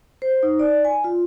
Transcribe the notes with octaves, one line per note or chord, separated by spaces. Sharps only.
C5
D#4
D5
G#5
F4